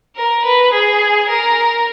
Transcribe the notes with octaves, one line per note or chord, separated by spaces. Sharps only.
A#4
B4
G#4
A#4